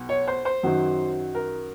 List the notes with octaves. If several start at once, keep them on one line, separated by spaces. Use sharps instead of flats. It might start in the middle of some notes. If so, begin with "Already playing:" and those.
Already playing: B1
C#5
C5
C5
F#2 D#3 F#3
A#4